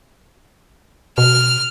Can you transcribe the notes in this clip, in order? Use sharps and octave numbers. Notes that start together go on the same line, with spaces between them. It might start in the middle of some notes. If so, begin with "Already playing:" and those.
B2 F6